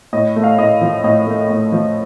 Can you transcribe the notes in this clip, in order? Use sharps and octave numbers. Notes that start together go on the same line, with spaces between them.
A2 D#5
A3
F5
A2 D#5
F3
A2 D#5
A3
A2
F3